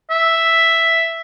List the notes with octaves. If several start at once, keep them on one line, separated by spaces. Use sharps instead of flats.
E5